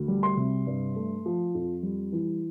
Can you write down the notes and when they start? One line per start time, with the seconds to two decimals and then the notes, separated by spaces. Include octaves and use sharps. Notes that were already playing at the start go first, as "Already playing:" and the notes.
Already playing: D2
0.08 G3
0.23 C6
0.37 C3
0.67 G2
0.96 A3
1.26 F3
1.55 F2
1.83 G3
2.12 E3